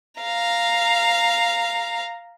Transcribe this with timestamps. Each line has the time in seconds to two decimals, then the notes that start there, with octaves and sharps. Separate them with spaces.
0.21 F5 A#5